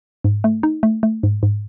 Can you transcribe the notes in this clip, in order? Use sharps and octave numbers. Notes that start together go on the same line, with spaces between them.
G#2
A3
D#4
A3
A3
G#2
G#2